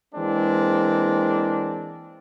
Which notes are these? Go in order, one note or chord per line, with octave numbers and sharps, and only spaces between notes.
E3 G#3 A#3 C4 D4